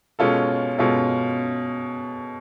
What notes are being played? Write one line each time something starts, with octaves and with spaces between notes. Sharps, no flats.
B2 G#3 C#4 F4 A4
B2 G#3 C#4 F4 A4